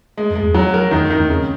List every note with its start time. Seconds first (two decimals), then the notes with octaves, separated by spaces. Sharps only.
0.17 G#3
0.30 F#2
0.35 G#3
0.42 E2
0.54 F#3
0.74 A#4
0.91 E2 D#3
1.04 F#2
1.10 D#3
1.17 E2
1.29 E2 C#3